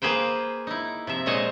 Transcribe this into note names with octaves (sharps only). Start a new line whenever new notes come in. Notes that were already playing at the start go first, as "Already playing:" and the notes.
A#3 G#4 B4 C5 G5
D#4 E4
C3 F3 E5
A#2 G#3 C5 C#5 D#5